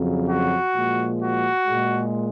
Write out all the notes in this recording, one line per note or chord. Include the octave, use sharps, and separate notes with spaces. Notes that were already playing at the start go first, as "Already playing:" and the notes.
Already playing: F2 C#3 F#3
F#4
A#2 F3 G#3
F#4
A#2 G#3